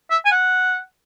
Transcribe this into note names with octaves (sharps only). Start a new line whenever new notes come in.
E5
G#5
F#5